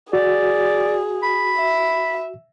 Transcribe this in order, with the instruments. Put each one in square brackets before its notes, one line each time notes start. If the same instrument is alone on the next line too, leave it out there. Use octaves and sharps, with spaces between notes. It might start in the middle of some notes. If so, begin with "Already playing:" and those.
[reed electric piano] F#4 [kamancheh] G#4 [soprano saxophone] D5
[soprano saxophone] B5
[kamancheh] E5